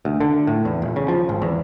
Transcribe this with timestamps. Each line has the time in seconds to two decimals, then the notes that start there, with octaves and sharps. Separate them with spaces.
0.05 D2
0.20 D3
0.47 A2
0.65 E2
0.82 D#1
0.96 C#3
1.08 F3
1.29 G#1
1.42 E2